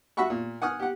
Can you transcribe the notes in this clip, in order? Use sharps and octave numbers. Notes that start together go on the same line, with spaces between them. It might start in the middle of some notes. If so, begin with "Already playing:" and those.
F#4 E5 F#5 B5 C#6
A#2
F#5 G#5 D#6 F6
G4 F#5